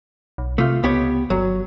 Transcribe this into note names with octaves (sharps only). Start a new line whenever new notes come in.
B1
C3 A3 F4
C#2 B3 G4 C#5
G1 F#3